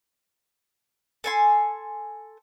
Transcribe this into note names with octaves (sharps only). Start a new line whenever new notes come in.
A4 G#5 C6